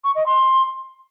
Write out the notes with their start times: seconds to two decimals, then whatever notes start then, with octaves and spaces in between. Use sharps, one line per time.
0.04 C#6
0.15 D#5
0.26 C6